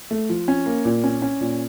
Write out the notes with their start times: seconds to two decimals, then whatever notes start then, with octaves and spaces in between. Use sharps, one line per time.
0.11 A3
0.29 F3
0.48 C#4
0.66 A#3
0.85 A#2
1.04 C#4
1.22 C#4
1.41 A#2